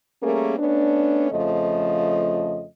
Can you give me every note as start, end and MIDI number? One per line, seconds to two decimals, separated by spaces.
0.23 0.55 55
0.23 0.55 57
0.23 0.55 58
0.23 0.55 61
0.23 0.55 68
0.23 0.55 70
0.58 1.30 57
0.58 1.30 59
0.58 1.30 61
0.58 1.30 62
1.31 2.65 41
1.31 2.65 49
1.31 2.65 53
1.31 2.65 57
1.31 2.65 75